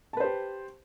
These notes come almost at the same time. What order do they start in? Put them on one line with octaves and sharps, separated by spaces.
A5 B4 C5 G4